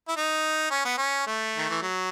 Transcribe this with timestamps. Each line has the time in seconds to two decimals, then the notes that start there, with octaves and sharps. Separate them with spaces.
0.08 E4
0.16 D#4
0.71 C#4
0.85 B3
0.98 C#4
1.27 A3
1.57 D#3
1.70 E3
1.82 F#3